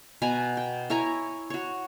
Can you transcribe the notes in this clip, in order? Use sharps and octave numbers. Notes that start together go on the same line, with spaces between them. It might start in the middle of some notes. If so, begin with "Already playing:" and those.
B2 B4 G#5 A#5
G5
E4 C#5 G#5 A#5
F#4 C#5